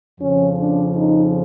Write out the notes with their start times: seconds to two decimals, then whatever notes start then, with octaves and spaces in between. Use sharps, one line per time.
0.20 F2 C#3 F3 C#4
0.58 D4
0.95 D#4